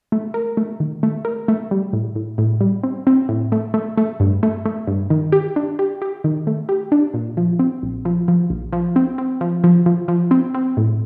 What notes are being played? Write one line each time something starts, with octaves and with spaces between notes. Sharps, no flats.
A3
A#4
A3
D#3
A3
A#4
A3
G3
A2
A2
A2
G3
C4
C4
A2
A3
A3
A3
G2
A3
A3
G2
D#3
G4
D4
G4
G4
D#3
A3
G4
D4
A#2
F3
C4
A#1
F3
F3
A#1
F3
C4
C4
F3
F3
F3
F3
C4
C4
A2